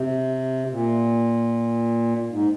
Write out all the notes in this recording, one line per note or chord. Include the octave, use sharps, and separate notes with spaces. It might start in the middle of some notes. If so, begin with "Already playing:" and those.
Already playing: C3
A#2
G#2